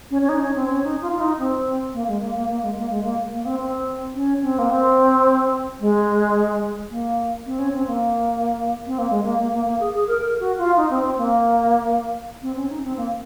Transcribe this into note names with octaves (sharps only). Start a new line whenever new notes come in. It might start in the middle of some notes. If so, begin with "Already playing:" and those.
C#4
C#4
D#4
C#4
C4
C#4
D#4
F4
F4
D#4
C4
A#3
G#3
A#3
A#3
A#3
G#3
A#3
G#3
A#3
A#3
C4
C4
C#4
C4
A#3
C4
G#3
A#3
C4
C#4
C4
A#3
C4
A#3
G#3
A#3
A#3
A#3
A#3
G#4
G#4
A#4
A#4
F#4
F4
D#4
C4
C4
A#3
C4
C#4
D#4
C4
A#3